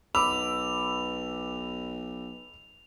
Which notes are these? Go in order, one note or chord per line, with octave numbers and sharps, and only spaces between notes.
B1 B5 D6 E6 F7